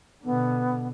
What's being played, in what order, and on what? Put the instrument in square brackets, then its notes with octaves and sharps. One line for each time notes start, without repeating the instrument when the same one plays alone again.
[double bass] B2 D3 [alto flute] B3